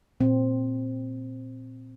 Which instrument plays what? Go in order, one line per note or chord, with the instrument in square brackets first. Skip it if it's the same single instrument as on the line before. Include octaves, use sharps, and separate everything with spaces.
[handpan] A#2 C4